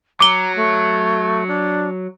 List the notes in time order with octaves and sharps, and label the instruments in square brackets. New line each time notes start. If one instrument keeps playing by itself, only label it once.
[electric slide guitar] F#3 [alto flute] A#5 [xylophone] D6 G7
[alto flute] A3
D4